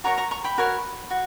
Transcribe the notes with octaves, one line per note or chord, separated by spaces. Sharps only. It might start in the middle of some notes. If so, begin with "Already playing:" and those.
F#4 A#4 C#5 A#5 C#6
A#5 C#6
A#5 C#6
G5 B5
F#4 A#4 C#5
F#4